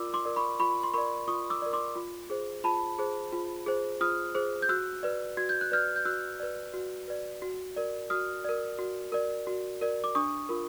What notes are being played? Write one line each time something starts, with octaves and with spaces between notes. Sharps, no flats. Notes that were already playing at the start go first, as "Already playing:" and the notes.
Already playing: F4 A#4 D5 D6 E6
C6 D6
A#4 D5
B5 C#6
F4 B5 C#6
C6
A#4 D5 B5 C#6
F4 C#6 D#6
D6 E6
A#4 D5
C6 D6
F4
G#4 C5
F4 A5 B5
G#4 C5
F4
G#4 C5
F4 D#6 F6
G#4 C5
G6
F#4 E6 F#6
B4 D5
F#4 G#6
G6
F#6
B4 D5 F6 G6
G6
F#4 E6 F#6
B4 D5
F#4
B4 D5
F#4
A#4 D5
F#4 D#6 F6
A#4 D5
F#4
A#4 D5
F#4
A#4 D5
D6
D4 C#6 D#6
F4 A#4